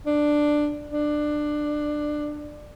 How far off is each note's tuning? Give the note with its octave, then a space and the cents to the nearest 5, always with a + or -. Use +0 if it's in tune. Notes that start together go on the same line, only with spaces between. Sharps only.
D4 +10
D4 +20